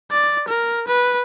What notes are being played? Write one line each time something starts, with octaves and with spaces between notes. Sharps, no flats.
D5
A#4
B4